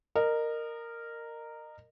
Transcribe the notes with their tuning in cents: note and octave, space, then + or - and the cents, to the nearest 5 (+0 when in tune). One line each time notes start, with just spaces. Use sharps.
A#4 -10 D#5 -30